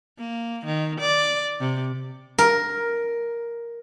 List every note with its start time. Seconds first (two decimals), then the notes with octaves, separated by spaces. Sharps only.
0.18 A#3
0.65 D#3
1.00 D5
1.60 C3
2.38 A#4